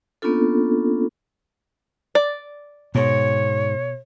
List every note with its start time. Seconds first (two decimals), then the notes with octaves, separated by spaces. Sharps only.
0.22 A#3 B3 C#4 D4 F4 A4
2.15 D5
2.95 G#2 B2 C#5